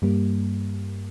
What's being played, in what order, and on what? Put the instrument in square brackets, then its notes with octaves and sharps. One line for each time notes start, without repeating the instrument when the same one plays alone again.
[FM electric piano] G2 G3 A#3